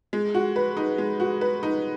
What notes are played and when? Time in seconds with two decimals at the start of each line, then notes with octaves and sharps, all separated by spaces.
0.13 G#3
0.35 F#4
0.56 B4
0.77 D#4
0.98 G#3
1.20 F#4
1.41 B4
1.63 D#4